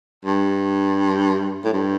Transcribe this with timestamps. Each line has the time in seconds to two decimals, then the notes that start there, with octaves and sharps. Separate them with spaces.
0.25 G2
1.64 A2
1.73 G2